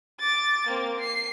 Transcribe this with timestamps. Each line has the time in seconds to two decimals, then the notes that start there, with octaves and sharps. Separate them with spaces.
0.20 D6 A6
0.67 A#3 C4
1.00 C7